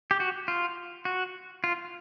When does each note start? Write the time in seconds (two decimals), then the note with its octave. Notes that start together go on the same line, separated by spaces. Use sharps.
0.11 G4
0.20 F#4
0.48 F4
1.05 F#4
1.64 F4